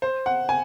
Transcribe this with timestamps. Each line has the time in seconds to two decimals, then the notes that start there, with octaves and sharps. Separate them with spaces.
0.02 C5
0.26 F#5
0.49 G#5